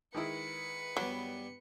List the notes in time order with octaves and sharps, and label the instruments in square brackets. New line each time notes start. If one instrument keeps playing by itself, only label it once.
[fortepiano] D#3 G#3 E4 [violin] B4 C#7
[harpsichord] G2 G3 B3 [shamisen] F#3